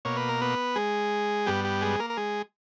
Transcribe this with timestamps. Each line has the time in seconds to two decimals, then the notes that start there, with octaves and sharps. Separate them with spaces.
0.05 B2 A#3 C#5
0.17 B4
0.29 A#4
0.41 B3 B4
0.76 G#3 G#4
1.46 G2 G3 B3 G4
1.64 G4
1.82 G#3 G#4
2.00 A#3 A#4
2.10 A#4
2.17 G#3 G#4